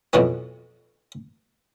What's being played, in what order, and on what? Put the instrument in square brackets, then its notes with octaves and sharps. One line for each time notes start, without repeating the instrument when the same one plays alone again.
[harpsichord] F2 B2 E3 F#3 B3